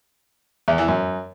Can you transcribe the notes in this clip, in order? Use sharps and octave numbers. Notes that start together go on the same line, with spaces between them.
E2
E3
F#2